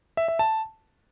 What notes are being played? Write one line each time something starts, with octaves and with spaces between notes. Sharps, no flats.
E5
E5
A5